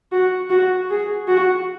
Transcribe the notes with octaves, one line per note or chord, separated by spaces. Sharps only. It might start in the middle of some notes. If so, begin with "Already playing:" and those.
F#4
F#4
G#4
F#4